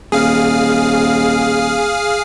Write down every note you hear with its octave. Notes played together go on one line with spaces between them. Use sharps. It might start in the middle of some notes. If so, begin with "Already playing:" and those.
D#1 G#4 F5